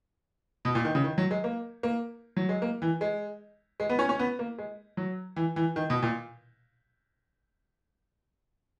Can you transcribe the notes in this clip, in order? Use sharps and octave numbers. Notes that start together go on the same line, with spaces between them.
B2
A#2
D#3
C#3
D#3
F#3
G#3
A#3
A#3
F#3
G#3
A#3
E3
G#3
G#3
B3
C#4
C#4
B3
A#3
G#3
F#3
E3
E3
D#3
B2
A#2